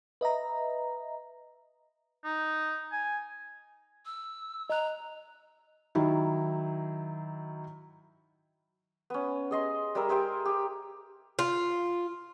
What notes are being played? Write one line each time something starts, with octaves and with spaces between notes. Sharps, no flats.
B4 D#5 E5 A#5
D#4
G#5
E6
D#5 A#5 F#6
D#3 F#3 D#4 E4
B3 C#4
G#4 D#5 C6
G3 G#4 A#4 E5
G#4 C5 E5 G5
G4
F4